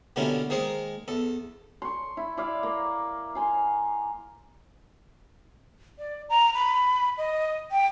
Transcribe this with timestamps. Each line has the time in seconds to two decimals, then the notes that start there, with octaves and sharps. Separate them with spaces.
0.16 B2 D3 G3 A#3 C#4 E4
0.50 D#3 G#3 A#3 G#4 C5
1.08 E2 A4
1.82 C6 C#6
2.17 E4
2.37 E4 D5 F5
2.63 A#3
3.35 F5 G#5 C6
5.98 D5
6.29 A#5
6.54 B5
7.18 D#5
7.71 G5